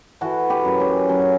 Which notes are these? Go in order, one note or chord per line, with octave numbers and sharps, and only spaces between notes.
E3 F#4 A4
G4 B4
F#2
C#4
F#3 C#4